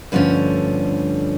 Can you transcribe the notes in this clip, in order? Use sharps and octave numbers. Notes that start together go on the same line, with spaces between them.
G2 D3 F3 A3 C#4